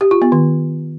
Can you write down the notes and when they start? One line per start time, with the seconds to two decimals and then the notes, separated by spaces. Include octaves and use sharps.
0.01 G4
0.11 F4
0.22 B3
0.32 D#3